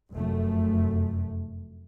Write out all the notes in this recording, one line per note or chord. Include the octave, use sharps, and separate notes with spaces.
F1 F#2 A3